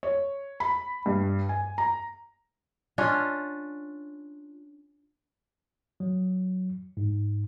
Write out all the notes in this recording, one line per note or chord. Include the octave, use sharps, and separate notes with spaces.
C#5
B5
G2
G#5
A#5
C#4 D4 F4
F#3
G#2